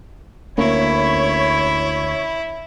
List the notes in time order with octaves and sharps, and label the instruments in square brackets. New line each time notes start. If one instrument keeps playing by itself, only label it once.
[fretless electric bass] D2 A#3 C#4 [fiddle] E4 [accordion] C#5 [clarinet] B5